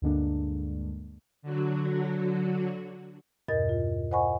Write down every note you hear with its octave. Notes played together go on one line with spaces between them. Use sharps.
D2 G2 D3 G#3 A#3 D4
D3 F#3 F#4
E2 G2 B2 A#4 D#5 A6
F4
C5 D#5 F#5 G#5 B5 C#6